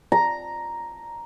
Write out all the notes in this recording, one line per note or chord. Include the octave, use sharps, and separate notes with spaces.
A#5